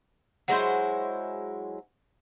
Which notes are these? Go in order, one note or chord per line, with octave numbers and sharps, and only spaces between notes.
F#3 G#3 E4 C5